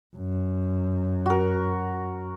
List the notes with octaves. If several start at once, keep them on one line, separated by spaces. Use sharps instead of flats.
F#2
F#4 A#4